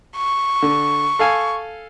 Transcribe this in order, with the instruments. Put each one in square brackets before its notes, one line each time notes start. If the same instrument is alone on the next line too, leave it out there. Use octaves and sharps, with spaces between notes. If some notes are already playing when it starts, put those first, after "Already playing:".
[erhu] C#6
[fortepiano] D3
A4 F5 G#5